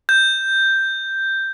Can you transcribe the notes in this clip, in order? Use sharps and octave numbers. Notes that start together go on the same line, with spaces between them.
G6